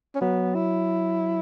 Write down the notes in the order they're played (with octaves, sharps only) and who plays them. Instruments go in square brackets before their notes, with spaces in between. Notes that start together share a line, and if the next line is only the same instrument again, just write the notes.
[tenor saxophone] C#4
[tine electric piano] F#3 [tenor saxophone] B3
[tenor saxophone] E4